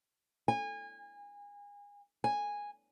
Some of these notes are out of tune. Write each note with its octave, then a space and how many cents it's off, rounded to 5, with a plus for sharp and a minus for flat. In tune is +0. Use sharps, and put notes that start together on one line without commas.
G#5 -30
G#5 -10